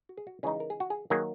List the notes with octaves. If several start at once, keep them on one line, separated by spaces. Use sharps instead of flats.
F#4
G#4
F#4
C#3 E3 G#3 D#4 G#4
A#4
G#4
F#4
G#4
D#3 F#3 A#3 G#4